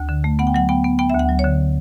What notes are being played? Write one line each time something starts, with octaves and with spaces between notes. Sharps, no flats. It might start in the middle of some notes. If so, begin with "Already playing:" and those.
Already playing: D2
D3
A3
B3 F#5
G5
F#3 F#5
B3 G5
B3
B3 G5
D2 E5
F#5
F#3
C#5
D3